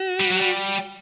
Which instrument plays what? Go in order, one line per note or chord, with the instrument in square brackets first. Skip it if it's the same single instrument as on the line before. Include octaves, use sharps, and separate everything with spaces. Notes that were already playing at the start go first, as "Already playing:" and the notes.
Already playing: [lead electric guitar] F#4
[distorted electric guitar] G3
F#3
G3